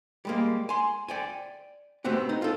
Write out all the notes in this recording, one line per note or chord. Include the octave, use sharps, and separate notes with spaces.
G3 G#3 A#3
G#5 C6
D5 G5 G#5
A3 B3 C4 F#4 G4
D#4
F4 A4